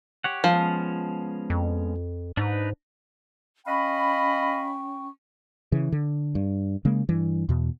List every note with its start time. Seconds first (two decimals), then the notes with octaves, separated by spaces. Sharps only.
0.24 G4 C#5 F#5
0.44 F3 G#3 B3 C#4
1.50 F2
2.37 G#2 D4 D#4 B4
3.67 C#4 D#5 F5 G5 B5 C#6
5.72 C#3 E3
5.92 D3
6.35 G2
6.85 C#3 G#3 A#3
7.09 G2 E3
7.49 E2 B2